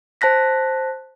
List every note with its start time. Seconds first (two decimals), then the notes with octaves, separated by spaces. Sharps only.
0.21 C5 A5 F#6 A#6 B6